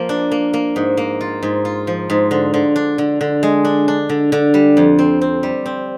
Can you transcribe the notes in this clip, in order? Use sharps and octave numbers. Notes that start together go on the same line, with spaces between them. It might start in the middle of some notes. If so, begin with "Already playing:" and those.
Already playing: F3 A#3
D4
A#3
A#3
G#2
A#3
F4
G#2
F4
F3
G#2
D3
D3
D4
D3
D3
G#3
D4
D4
D3
D3
G3
F2
C4
C4
G3
C4